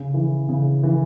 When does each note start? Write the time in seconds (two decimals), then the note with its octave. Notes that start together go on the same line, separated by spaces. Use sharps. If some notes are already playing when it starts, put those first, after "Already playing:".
Already playing: C#3
0.14 E3
0.49 C#3
0.83 E3